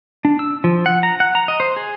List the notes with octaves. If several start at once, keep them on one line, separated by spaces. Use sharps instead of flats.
D4
E6
F3
F#5
A#5
F#5
A#5
D#5
C5
G#4